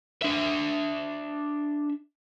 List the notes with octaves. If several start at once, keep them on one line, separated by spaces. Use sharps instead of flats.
D4 E5